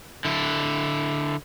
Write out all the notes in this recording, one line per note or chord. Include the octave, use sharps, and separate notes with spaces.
D3 E4